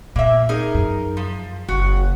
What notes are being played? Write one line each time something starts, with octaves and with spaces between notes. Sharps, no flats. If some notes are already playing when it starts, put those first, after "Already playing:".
A#2 A#3 E5
D#4 G#4 A#4
F#2
F3
F#1 F#4